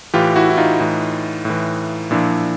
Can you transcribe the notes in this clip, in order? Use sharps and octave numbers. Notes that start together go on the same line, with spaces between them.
A2 E3 F4 G4
E4 F#4
E4
D#4 F4
A2 E3
A2
E3
A#2 F3 D4 E4